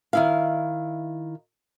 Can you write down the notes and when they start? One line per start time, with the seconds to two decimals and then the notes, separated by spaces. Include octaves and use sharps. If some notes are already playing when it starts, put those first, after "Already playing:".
0.13 D#3 E4 F5